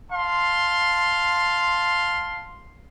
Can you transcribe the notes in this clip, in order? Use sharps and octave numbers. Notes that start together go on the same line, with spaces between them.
F5 A5 C6